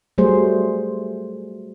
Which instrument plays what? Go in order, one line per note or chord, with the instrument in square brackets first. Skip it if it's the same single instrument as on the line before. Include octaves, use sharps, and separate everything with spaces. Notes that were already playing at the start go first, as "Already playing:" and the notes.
[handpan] F#3 G3 A3 G#4 C5